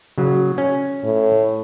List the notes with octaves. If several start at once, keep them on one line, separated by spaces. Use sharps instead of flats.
C#3 F#3
C#4
A2